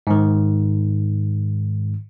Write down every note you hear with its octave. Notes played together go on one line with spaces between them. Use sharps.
G#2 D#3